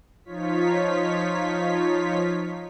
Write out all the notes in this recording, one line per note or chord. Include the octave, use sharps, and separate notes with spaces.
F3 D#4 F4 C#5 B6